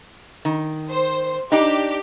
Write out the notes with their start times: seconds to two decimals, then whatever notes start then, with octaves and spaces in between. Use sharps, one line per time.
0.45 D#3
0.89 C5
1.52 D4 D#4 G4